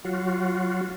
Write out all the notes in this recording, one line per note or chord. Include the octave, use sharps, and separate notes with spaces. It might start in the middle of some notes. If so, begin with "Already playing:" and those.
F#3 F4 F#4